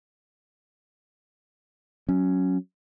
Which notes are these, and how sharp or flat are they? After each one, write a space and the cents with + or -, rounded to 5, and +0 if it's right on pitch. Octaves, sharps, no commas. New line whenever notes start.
F#3 +0 C#4 +0